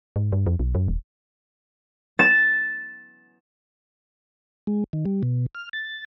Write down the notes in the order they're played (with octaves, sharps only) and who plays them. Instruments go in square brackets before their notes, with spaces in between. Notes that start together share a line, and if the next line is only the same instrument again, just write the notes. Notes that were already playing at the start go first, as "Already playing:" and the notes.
[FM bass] G#2
G2
F2
B1
F#2
D#1
[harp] A6 E7
[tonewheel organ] G#3
D#3
G3
B2
F6
A6